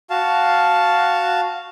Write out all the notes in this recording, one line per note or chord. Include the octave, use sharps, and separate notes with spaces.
F#4 F5 A5